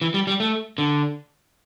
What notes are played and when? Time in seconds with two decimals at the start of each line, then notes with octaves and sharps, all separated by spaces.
0.01 E3
0.14 G3
0.27 G3
0.40 A3
0.78 D3